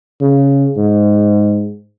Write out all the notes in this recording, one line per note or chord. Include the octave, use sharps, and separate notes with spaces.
C#3
G#2